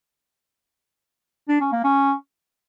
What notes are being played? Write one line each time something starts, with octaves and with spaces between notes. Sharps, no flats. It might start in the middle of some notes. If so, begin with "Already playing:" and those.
D4
C#4
A#3
C#4